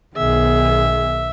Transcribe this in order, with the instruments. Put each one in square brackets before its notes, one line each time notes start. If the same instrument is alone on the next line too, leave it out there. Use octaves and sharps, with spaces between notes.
[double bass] B1 D#3 [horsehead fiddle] B3 G#4 [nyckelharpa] E5